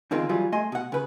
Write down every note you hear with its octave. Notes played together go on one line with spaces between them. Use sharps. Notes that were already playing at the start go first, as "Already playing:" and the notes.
E2 D3 D#3 G#3 C4 F4
E3 F#3 G3 F4 G#4
A3 D#5 G#5 C6
B2 F#5
C#3 B4